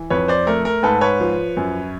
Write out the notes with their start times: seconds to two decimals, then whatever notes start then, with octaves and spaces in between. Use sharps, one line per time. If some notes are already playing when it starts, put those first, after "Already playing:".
Already playing: E3
0.10 F2 B4 C#5
0.28 C5 D5
0.47 A3 A#4
0.65 A#4
0.83 G#2 A4 B4
1.01 B4 C#5
1.20 F3
1.57 F#2